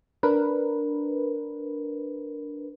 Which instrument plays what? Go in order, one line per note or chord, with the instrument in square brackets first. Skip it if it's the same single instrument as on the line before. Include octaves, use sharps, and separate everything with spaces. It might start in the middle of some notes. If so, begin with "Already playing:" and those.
[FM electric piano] D4 A#4 B4